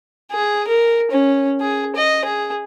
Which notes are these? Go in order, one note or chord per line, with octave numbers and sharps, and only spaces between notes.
G#4
A#4
C#4
G#4
D#5
G#4